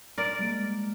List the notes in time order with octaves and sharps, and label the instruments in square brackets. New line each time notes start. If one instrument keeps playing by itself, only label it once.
[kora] A#4 D5
[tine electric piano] G3 G#3 A#3